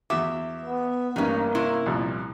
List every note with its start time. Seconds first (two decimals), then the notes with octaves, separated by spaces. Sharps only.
0.10 E2 F#4 E5 D6
0.66 B3
1.16 A1 G2 A#3 C#4 D#4
1.55 C3 C#4 E4
1.86 C2 F2 A#2